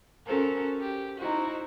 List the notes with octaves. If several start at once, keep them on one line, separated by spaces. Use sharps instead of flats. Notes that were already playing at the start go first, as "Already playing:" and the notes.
C#4 F#4 A4 A#4 C5
G4
D#4 E4 F#4 C5